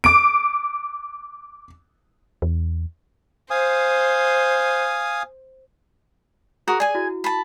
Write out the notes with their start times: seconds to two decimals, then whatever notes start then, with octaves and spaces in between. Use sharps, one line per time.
0.04 D6 D7
2.42 E2
3.50 C5 F5 G#5 D#6
6.68 F#4 G#4 A#4 D#6
6.80 G#4 D5 G#5
6.95 E4 F#4
7.24 A5 B5